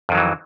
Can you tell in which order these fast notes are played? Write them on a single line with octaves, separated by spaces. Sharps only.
F2 D#3 F#3 E3